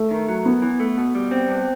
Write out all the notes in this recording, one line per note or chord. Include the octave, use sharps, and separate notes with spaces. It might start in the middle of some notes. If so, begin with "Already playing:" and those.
Already playing: A3
D#3
F#3
F#2 B3
E3
A3
B2
G3
C4
G2